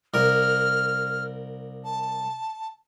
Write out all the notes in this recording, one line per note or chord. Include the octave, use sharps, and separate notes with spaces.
C2 A#4 F6
A5